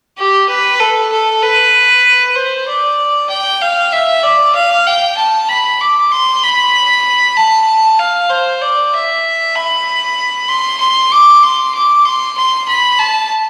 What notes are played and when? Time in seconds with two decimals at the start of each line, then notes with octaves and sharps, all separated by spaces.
0.17 G4
0.48 B4
0.79 A4
1.12 A4
1.42 B4
2.36 C5
2.67 D5
3.29 G5
3.61 F5
3.92 E5
4.23 D5
4.55 F5
4.86 G5
5.17 A5
5.48 B5
5.80 D6
6.11 C6
6.43 B5
7.37 A5
7.99 F5
8.30 C5
8.61 D5
8.93 E5
9.55 B5
10.49 C6
10.80 C6
11.11 D6
11.43 C6
11.74 D6
12.05 C6
12.37 C6
12.68 B5
12.99 A5